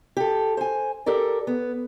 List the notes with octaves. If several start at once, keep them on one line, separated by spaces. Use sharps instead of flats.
G4 A4
C5 G#5
G4 A4 A#4 D5
B3